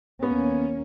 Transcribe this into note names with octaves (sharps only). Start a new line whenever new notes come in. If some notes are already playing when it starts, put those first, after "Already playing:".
D#2 A#3 B3 C#4